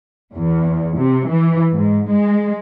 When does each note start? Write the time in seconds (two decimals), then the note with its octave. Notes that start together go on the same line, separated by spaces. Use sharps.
0.35 E2
0.97 C3
1.27 E3
1.71 G#2
2.10 G#3